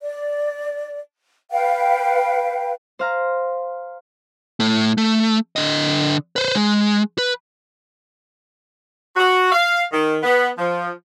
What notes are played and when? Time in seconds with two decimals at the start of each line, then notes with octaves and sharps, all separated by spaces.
0.01 D5
1.51 B4 F5 G5
2.99 C5 F5 A#5
4.60 A2 A3
4.98 A3
5.56 D3 D#5
6.36 B4 C5
6.55 G#3
7.18 B4
9.16 F#4
9.52 F5
9.92 D#3
10.23 B3
10.58 F3